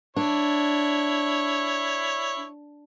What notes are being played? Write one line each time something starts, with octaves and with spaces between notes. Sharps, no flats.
D4 E4 C#5